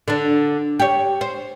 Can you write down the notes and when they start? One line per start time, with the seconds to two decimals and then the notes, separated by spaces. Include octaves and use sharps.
0.08 D3 D4
0.80 G4 C#5
1.21 C5